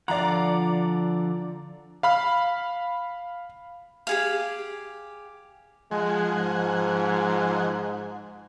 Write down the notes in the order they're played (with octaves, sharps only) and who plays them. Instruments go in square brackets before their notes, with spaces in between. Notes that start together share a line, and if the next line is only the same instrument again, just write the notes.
[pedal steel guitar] D3 F3 F#5 [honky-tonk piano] D5 A#5
[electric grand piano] F5 B5 F6
[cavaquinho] G4 G#4 F5
[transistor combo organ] F3 F#5 G#5 [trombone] G#3
[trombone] G#2